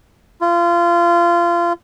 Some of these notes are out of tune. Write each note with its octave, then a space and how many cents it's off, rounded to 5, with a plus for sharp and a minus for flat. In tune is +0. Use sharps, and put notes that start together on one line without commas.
F4 -25